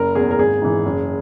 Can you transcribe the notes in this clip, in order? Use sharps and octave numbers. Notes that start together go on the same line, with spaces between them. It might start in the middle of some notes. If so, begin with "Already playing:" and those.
Already playing: F#1 A#4
E2 B2 G#4
A#4
G#1 G#4
G#2 E3
F#1